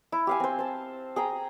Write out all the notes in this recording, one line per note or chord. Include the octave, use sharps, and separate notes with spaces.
E4
G4 F5 G#5
C4 C5
C5 A5
G#4 G5 A#5